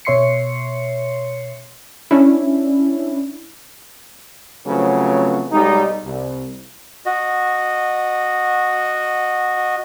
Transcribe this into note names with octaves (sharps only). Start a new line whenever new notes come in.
B2 C#5 E5 C6 C7 C#7
C#4 D4 E4
C#3 F3 F#3 A3 B3 C4
B1 G3 G#3 D#4
C2
F#4 D#5